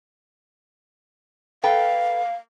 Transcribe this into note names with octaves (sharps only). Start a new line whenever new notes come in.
A4 B4 F5 G5